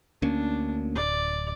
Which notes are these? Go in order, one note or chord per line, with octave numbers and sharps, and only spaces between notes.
D2 A#3 C#4 D4
D1 D5